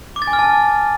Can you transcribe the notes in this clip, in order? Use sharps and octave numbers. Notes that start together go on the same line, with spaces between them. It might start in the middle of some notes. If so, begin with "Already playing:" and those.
D6
A6
G#5
F6
A5